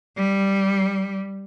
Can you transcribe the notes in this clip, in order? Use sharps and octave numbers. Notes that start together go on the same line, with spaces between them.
G3